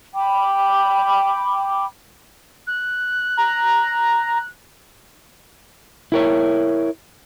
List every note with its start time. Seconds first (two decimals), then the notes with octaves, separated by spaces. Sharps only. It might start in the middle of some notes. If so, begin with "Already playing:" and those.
0.14 G5 B5 D6
2.67 F#6
3.37 A#5
6.12 E4 A#4 C#5